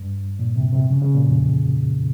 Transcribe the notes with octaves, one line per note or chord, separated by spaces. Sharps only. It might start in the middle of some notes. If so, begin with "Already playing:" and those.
Already playing: G2
A#2
C3
C3
C#3
C#3
A#2
F2
E2